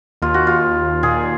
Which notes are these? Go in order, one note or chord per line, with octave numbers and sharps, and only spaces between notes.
D#2 F4
F#4
D#2 F4
D#2
A#2 G#4